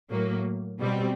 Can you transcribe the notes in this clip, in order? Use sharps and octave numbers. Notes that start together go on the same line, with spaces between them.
A2 F#3 A#3
B2 G3 C4